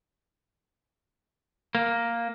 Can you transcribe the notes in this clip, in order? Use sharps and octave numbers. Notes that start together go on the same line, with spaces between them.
A#3